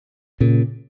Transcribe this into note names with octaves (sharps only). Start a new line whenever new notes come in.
A#2 C#3